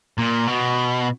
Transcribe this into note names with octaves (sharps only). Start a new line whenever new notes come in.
A#2
B2